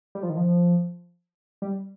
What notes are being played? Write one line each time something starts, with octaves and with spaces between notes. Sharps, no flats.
G3
F3
D#3
F3
G3